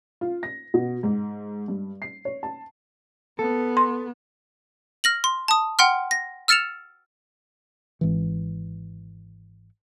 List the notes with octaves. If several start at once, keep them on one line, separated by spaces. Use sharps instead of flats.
F4
A#6
B2
G#2
G2
C7
C#5
A5
B3 A4
C6
F6 A#6 F#7
C6
A5 D#6
F#5 G5 C6 F6
A#6
E6 F6 A6 C#7 E7 F7
G#1 E3